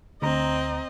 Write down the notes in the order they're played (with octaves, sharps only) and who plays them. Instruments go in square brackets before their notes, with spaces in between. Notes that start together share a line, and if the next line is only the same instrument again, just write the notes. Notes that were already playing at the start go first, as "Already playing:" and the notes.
[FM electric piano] D2 A#5 [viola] C4 D#5